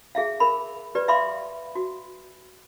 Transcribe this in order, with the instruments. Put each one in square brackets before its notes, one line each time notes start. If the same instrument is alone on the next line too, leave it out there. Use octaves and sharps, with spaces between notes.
[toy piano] G#4 E5 F5
A#4 B5
G4 B4 D5
E5 F5 B5 C6 D6
F#4